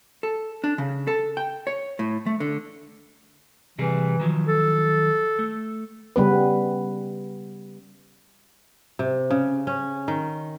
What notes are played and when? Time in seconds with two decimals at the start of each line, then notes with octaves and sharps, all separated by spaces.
0.23 A4
0.64 D4
0.78 C#3
1.07 A4
1.37 G5
1.67 C#5
1.99 A2
2.26 A3
2.40 D3
3.79 C3 E3 G3 G#4
4.20 D#3 F3 F#3
4.47 A4
5.39 A3
6.16 C#3 G3 B3 B4
8.99 C3
9.31 C#3
9.67 C#4
10.08 D#3